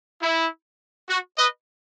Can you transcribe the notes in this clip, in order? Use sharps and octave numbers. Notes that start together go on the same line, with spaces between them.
E4
F#4
B4 D#5